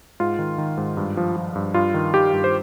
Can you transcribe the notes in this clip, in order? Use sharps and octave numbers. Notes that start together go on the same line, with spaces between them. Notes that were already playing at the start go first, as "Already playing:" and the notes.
G#2 F4
D#3
D#3
G#2
G2
F3
F3
G2
G2 F4
D#3
D#3 G4
G2
C5